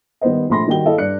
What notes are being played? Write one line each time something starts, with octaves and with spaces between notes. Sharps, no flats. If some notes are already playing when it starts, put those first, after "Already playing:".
D#3 G3 B3 C5 D#5
A#1 A3 B5 C6 A#6
D#3 G3 F#4 G5 G7
E4 A4 D#5 F5
G2 D5 F#6 C#7